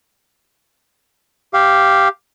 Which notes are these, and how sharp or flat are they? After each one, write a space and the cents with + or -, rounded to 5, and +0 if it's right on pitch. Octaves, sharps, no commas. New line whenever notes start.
G4 +0 F5 -5